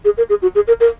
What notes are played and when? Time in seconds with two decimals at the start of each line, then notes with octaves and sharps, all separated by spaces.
0.05 G#4
0.18 A#4
0.29 G#4
0.42 F#4
0.55 G#4
0.68 A#4
0.80 A#4